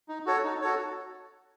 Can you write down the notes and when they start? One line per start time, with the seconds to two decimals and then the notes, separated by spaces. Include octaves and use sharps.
0.09 D#4
0.26 F#4 A4 C#5
0.44 D#4
0.61 F#4 A4 C#5